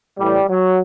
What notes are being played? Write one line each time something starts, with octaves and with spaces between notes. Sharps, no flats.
A2 E3 G3
F#3